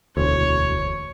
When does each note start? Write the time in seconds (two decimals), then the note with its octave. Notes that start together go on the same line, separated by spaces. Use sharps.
0.17 E1 D2 C#5